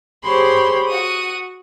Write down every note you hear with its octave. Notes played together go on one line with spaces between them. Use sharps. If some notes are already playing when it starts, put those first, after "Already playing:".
G4 G#4 C5 C#5 B5 C6
F#4 D#6